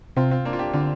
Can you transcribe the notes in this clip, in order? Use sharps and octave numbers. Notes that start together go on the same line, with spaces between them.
C3 C4 F4
C4 F4
A#3 D4
F4
D4 G4
D3 C4 F4